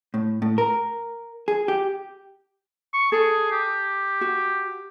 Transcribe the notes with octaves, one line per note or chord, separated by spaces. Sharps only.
A2
A2
A#4
G#4
G4
C#6
G#4 A4
G4
F#4